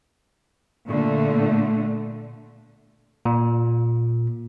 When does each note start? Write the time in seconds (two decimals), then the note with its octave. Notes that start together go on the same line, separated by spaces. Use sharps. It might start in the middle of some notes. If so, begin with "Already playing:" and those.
0.88 A#2 D3 A3
3.25 A#2